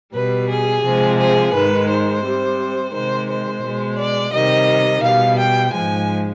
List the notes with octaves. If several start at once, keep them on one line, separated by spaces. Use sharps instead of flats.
B2 G3 B4
G#4
C3 F3 G#3
G#4
G#2 D#3 G#3 B4
C5
C3 G3
C3 D#3 G#3 C5
C5
B2 G#3
D5
C3 D#3 G3 D#5
B2 G3 F5
G5
G#2 F3 G#3 G#5